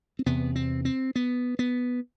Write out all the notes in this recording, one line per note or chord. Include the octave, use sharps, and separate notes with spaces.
C4
E2 C3 B3
C4
C4
B3
B3